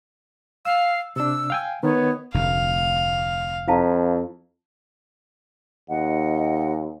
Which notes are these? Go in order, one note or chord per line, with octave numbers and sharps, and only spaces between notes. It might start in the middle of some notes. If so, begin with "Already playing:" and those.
F5 E6
C3 D4 E6
F5 G5 G#5
D#3 B3 C#5
F1 D2 F5
F2 E4 F5 A5
D#2 D#5 F#5